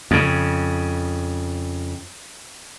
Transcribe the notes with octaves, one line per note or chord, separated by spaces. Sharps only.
F2 C#3